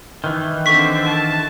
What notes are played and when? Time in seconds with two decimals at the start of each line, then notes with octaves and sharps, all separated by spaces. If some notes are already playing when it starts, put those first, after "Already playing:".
0.24 D#3 E3
0.66 D3 C4 C#6 B6
1.06 A5